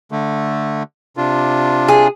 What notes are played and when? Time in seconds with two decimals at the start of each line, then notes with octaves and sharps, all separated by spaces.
0.12 D3 A3
1.17 C3 D4 F4
1.88 G#4